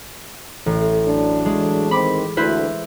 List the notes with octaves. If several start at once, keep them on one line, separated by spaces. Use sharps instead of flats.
A1
F#3 A3 D4
G#3
D#3 C4 B5 D6
D2 E4 B4 C5